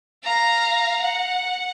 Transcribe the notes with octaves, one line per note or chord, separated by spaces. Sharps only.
F5 A#5
F#5